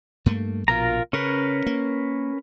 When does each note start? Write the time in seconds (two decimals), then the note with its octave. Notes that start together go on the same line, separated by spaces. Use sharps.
0.26 G2 A3 A#3
0.68 A#1 B2 F4 A#4 A#5
1.13 C#3 C#4 A#4 B4
1.66 A#3